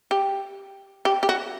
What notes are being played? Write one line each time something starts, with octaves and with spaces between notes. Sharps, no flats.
G4
G4
G4
F#4